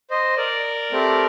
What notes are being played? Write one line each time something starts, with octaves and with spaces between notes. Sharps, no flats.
C5 D#5
A#4 D5
A3 C4 G4